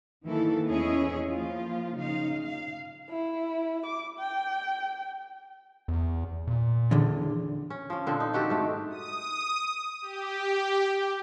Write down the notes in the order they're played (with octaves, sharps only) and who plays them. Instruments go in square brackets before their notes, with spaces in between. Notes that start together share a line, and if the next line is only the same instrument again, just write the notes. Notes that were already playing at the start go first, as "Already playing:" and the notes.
[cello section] D#3 E3 A#3 E4 A4
E2 C#4 E4 G#4 C#5 D#5
F3 A#3 F4
C#3 D#4 F5
F5
[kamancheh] E4
D6
G5
[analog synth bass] E2
A#2
[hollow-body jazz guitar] E2 D3
[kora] C#4
F3 C#4
A#2 D3 C4
D#4
D#3 F#4 G4 A4
G#2 A3
[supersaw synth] D#6
G4